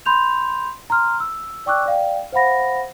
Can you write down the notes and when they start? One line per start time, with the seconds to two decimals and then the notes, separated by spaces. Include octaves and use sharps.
0.06 B5 C6 G6 F7
0.90 A#5 C6 F6
1.20 E6
1.66 D5 G5 C#6 D6 E6 F#6
1.86 D5 F5 G5
2.32 C5 F5 F#5 B5 A#6